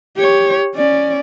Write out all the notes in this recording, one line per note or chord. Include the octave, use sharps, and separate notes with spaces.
G4 C#5
C#4 D5